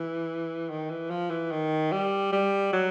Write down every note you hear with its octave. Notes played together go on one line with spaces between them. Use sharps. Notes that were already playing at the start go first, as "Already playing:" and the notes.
Already playing: E3
D#3
E3
F3
E3
D#3
G3
G3
F#3